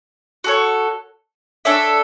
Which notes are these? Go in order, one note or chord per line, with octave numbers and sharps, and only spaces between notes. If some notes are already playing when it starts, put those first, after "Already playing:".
F#4 A4 C#5
D4 A4 C#5 E5